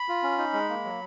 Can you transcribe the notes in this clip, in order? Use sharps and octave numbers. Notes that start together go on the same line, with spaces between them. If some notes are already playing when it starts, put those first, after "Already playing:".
Already playing: B5
F4
C#4
D#4
G#3
A#3
F#3